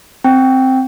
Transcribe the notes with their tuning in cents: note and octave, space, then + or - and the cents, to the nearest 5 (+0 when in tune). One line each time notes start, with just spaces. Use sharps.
C4 +0 G5 +0